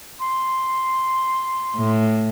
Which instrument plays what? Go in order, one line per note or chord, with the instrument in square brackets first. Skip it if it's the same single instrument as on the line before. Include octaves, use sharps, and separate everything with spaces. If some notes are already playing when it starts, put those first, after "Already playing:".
[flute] C6
[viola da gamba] A2